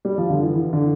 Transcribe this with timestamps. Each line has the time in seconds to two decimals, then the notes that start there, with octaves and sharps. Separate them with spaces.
0.05 G3
0.18 F3
0.30 D3
0.43 E3
0.55 E3
0.73 D3